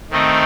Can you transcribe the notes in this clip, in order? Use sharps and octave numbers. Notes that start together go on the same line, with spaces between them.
D#3 A3 C4 D#4